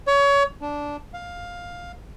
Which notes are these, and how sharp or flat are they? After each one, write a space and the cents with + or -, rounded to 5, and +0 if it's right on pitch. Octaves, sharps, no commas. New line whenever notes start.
C#5 +25
D4 -10
F5 +10